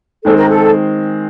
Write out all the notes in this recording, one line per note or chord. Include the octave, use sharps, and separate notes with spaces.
D#3 G#3 C4 A4
A#4
A4